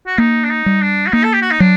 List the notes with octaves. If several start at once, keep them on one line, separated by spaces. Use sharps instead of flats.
F#4
A#3 D#4
D4
D#4
G3
D4
F#4
A#3 D#4
A4
G4
F#4
D#4
F#3 D4